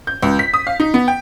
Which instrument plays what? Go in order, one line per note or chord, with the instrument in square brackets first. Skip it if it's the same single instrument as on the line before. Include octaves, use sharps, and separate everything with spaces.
[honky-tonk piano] G6
C#2
B6
D#6
F5
D#4
B3
G5